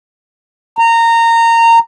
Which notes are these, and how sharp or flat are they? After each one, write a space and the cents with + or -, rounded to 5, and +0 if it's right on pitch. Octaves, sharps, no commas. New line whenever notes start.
A#5 -20